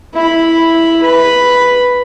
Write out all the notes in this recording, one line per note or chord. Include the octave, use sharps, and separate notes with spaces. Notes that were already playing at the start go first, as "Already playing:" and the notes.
E4 B5
B4 B5